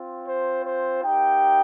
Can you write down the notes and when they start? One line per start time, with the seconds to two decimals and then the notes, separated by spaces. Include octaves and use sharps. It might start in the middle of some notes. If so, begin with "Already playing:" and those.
Already playing: C4 F4
0.26 C5
0.64 C5
1.02 A#3 D#4 G4 G5